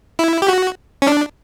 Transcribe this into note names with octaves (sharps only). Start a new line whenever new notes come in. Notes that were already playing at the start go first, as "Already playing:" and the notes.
E4
G4
F#4
C#4
D4